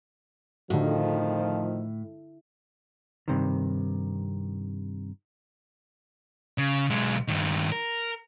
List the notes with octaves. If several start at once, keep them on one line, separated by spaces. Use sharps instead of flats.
F2 A2 D3 D#3 F3 F#4
G2 C3 D#3
C#3
B1 G#3
G2 D#3
A#4